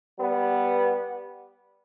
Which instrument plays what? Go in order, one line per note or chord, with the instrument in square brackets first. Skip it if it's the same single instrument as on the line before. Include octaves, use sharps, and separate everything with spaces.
[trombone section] G3 B3